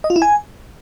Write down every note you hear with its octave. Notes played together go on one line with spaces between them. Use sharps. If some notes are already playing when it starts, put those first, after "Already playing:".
D#5
F4
E4
G#5